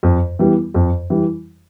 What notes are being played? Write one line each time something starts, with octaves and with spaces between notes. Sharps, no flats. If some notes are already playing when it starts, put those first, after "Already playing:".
F2
E3 G3 B3
F2
E3 G3